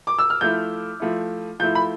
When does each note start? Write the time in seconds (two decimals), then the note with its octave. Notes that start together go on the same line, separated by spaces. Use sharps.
0.07 D6
0.19 E6
0.30 F6
0.41 F3 A3 E4 G6
1.00 F3 A3 E4
1.60 F3 A3 E4 G6
1.75 B5